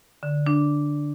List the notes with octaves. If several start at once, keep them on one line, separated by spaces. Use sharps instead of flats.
D3
D4